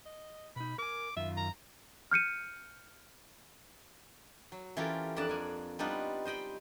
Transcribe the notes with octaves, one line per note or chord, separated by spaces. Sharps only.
D#5
B2 D#4 B5
A#4 G#5 D6
F#2 D#3 F4 E5
A#5
F6 G6 C#7 D#7
F#3
E3 C#4 F4 G4 A4 A#4
F2 D4 A#4 F#5 A5
A#3 G#5
G3 B3 D4 D#4 F4
C5 D#5 G5 B5